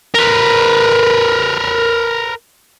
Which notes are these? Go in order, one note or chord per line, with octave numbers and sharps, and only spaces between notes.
A#4 B4